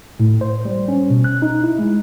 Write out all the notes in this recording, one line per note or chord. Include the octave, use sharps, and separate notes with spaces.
A2
C5
G3
C#4
B2
F#6
D#4
E4
G#3